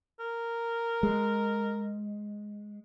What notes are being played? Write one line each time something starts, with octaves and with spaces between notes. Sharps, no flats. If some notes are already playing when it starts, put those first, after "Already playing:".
A#4
G#3